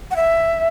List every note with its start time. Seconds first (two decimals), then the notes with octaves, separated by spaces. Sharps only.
0.11 F#5
0.16 E5